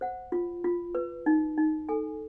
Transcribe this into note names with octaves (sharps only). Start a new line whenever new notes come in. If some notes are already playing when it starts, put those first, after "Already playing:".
C5 F#5
F4
F4
B4
D#4
D#4
A4 G#5